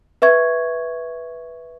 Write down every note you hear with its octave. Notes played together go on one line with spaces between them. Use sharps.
B4 E5 C#6 G#6